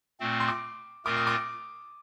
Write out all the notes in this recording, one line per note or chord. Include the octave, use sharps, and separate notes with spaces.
A#2 A3 C4
C6
D6
A#2 A3 C4 F4 A#4 D6
D#6
D6